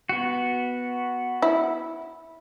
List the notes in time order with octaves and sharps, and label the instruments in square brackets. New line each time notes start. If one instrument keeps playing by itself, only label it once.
[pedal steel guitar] B3 F#4
[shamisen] E4